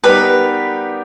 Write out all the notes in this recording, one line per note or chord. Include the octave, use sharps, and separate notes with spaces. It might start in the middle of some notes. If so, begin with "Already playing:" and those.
G3 B3 D#4 G4 A#4 B4 B5